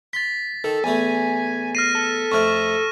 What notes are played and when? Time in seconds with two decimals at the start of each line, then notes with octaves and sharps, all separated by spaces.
0.13 C6 A6 B6
0.64 D#3 A4
0.84 E2 A3 G#5
1.75 F6 A#6 C7 D#7
1.95 A4
2.32 F2 A3 C#6 F6